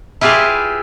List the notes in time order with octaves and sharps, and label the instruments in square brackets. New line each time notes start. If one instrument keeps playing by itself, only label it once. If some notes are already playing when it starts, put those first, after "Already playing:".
[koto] E4 F4 G4 G#4 B4 F5